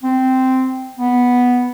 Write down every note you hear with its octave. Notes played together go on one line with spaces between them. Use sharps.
C4
B3